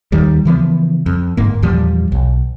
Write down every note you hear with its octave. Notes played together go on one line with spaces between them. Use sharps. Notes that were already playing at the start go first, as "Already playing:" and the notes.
D#2 D#3 G3
C#3 E3 F3 B3
F2
G1 G#2 A#3
E2 A#2 F3 G3
B1